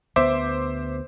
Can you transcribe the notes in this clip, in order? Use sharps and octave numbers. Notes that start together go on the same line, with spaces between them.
D2 B3 C5 E5 D6